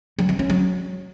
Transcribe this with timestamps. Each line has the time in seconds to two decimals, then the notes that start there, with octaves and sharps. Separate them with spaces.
0.19 F#3
0.29 C4
0.39 C#4
0.50 F#3